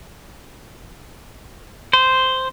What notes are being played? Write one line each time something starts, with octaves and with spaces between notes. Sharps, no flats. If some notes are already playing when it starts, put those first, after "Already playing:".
C5